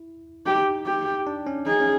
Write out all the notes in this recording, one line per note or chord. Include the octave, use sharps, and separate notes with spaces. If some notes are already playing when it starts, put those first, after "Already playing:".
Already playing: E4
D#4 G4
G4
D4
C#4
D#4 G#4
C#4